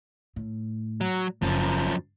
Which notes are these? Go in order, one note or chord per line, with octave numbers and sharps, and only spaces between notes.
A2
F#3
F#1 F#2 F3